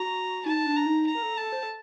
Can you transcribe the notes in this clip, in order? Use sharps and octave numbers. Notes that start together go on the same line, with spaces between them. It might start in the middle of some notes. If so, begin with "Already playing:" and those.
Already playing: F#4 A#5
D#4 A5
D4
A#5
D#4
A#5
A#4
A4
A4 A5
C5
A4